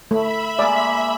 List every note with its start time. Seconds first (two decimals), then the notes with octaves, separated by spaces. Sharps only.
0.11 A3 E5 B5
0.59 G#3 A#3 D5